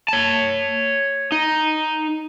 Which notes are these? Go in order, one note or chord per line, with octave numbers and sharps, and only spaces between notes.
C#5 A5
D#4